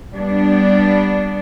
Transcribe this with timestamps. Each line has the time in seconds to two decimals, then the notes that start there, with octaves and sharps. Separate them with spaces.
0.13 G3 B3 D4